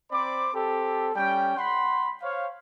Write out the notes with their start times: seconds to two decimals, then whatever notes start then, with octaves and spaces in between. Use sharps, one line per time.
0.11 C4 C5 D5 B5 D6
0.54 C4 G4 A4
1.16 G3 C#4 G5
1.57 F#5 B5 C6
2.22 C5 C#5 F5